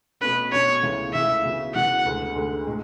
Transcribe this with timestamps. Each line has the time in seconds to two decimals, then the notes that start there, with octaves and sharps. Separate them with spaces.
0.21 B2 A3 C#4 B4
0.52 B2 A3 C#4 C#5
0.82 C#2 C#3 E3 A3 E4
1.14 C#2 C#3 E3 A3 E4 E5
1.43 C#3 E3 B3 F#4
1.74 C#3 E3 B3 F#4 F#5
2.06 D2 D3 G#3
2.36 D2 D3 G#3
2.67 A2 G#3